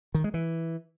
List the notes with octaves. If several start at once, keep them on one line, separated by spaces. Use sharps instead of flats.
D#3
G#3
E3